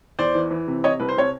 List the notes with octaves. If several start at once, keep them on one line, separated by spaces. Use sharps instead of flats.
E2 C5 D5
E3
E3
C3
C3 C#5 D#5
C2 B4
C5
C3 C#5